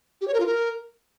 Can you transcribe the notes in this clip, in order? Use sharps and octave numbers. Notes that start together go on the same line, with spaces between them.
G4
C#5
A#4
F4
A#4